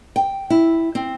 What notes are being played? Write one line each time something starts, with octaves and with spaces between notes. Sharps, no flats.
G5
E4
C4